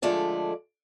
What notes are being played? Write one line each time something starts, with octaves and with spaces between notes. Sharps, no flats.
D3 F3 G#3 A3 D5 A5